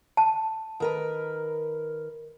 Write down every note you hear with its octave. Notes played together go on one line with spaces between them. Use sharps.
A5
D#3 A#4 B4